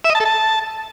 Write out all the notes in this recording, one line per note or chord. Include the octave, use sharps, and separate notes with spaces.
E5
D#5
A5
A4
A5